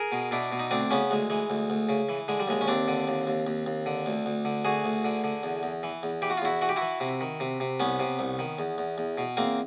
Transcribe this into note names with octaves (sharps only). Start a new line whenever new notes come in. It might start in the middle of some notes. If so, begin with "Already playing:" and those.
Already playing: G#4 A#4
B2
B2 D4 E4
B2
D#4
D2 C4 D4
C#3 B3 C#4
D2 G#3
E3 G#3
D2
D2
C#3
E3
D3 G#3
G3
D#2 G#3
C#4
D#2 C4 D4
D3
D#2
D#2
D#2
D#2
D3
D2
D2
D3
D2 F#4 G#4
D2
D3
D3
E2
E2
E3
E2
E3 G4
F#4
F4
E2 E4 F#4
E3 F#4
G4
E4 F#4
E3
C3
D#3
C3
C3
C2 B3 C#4
C3
C2
D#3
E2
E2
E2
B2
E2 A#3 C4